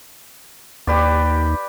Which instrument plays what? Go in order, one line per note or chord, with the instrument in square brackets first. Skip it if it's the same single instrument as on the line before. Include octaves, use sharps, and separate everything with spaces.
[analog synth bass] D#2 [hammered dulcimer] G4 B4 D5